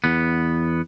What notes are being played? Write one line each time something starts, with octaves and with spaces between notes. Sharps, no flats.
E2 B3